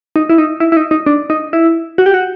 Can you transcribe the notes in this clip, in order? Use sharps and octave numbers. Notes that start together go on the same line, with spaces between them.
D#4
E4
D#4
E4
E4
D#4
D#4
D4
D#4
E4
F#4
G4
F#4